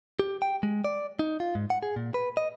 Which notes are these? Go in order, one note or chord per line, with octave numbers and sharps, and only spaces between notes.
G4
G5
G#3
D5
D#4
F4
G#2
F#5
G#4
A#2
B4
D#5